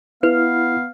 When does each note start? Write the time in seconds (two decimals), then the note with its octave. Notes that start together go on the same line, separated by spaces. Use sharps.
0.23 B3 E4 B4 F5